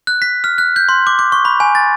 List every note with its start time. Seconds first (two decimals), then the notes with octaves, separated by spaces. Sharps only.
0.07 F#6
0.22 B6
0.44 F6
0.58 F#6
0.76 G6
0.89 C6
1.07 D6
1.19 D6
1.32 C#6
1.45 B5
1.60 G#5
1.75 A6